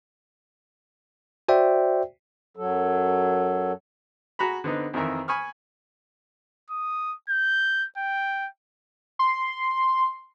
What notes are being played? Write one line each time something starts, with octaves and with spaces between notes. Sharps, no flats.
F#4 C5 D5 E5 G5
F#2 F#3 A4
F#4 G#4 A#5 B5
D3 B3 C4 D#4
F2 D#3 E3 A#4 E5
G#5 B5 C#6 D#6 F6
D#6
G6
G5
C6